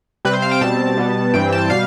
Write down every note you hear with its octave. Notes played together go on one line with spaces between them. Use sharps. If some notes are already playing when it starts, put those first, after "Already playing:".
C3 G3 C4 B4
C5
F5
G5
B2 G3 C4 A5
B2 G3 B3
G2 E3 G3 C4 G5
A5
B2 G3 F5